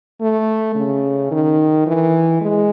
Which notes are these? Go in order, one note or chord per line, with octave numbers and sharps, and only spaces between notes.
A3
C#3
D#3
E3
G#3